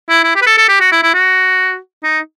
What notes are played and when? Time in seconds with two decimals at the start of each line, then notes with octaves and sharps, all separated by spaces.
0.09 E4
0.24 E4
0.36 G4
0.42 B4
0.47 A4
0.57 A4
0.69 G4
0.80 F#4
0.92 E4
1.03 E4
1.14 F#4
2.03 D#4